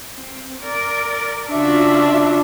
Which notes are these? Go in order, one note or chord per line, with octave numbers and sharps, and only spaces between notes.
C4
A#4 D5
C#3 D4 F4 F#4 E5